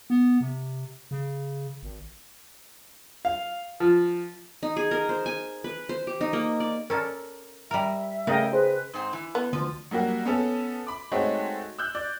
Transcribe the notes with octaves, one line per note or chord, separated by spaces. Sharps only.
B3
C3
C#3
G#1
F5
F3
D#4
G#4
A#4
C5
G#5
B4
C5
G4
D#4
A#3
D5
C#4 A4 A#4 D5
G3 A#4 E5 A#5
C#3 A3 A#4 D#5 G5
G#4 B4 C5
G#2 C4
E3
B3
D2 F3
F#3 G3 A#3 F#4
B3 C#4 A4
B5 D6
G#3 A3 C4 D#4 F#4 C#5
E6 F#6 G6
D5